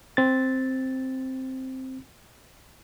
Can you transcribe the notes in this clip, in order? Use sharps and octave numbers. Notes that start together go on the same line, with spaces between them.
C4 A6